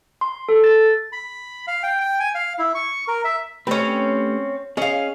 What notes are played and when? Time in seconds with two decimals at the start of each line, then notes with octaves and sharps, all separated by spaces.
0.21 C6
0.49 A4
0.64 A6
1.12 B5
1.67 F5
1.83 G5
2.00 G5
2.20 G#5
2.35 F5
2.59 E4
2.75 C#6
3.08 A#4
3.24 E5
3.67 A3 C4 C#4 G4 B4
4.77 C#4 G#4 D#5 F5